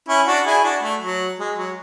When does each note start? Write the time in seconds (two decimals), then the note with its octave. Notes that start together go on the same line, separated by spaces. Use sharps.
0.08 C#4 E4
0.27 D4 F#4
0.46 E4 G#4
0.64 D4 F#4
0.82 A3
1.02 F#3
1.39 G#3
1.58 F#3